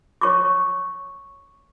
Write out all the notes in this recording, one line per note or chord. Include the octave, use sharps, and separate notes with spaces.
C#5 C#6 D6